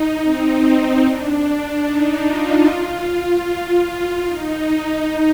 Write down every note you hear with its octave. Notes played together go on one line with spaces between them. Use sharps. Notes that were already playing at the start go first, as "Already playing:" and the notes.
Already playing: D#4
C4
D4
D#4
F4
F4
D#4